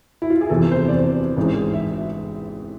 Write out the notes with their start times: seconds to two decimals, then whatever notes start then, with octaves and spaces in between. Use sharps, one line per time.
0.22 E4
0.30 F4
0.41 G#4
0.50 F1 E2 C3 E3 A4
0.71 C5
0.88 D5
0.94 C5
1.37 A1 G#2 G#3
1.74 E5